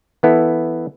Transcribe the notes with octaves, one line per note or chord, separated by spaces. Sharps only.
E3 B3 E4 A4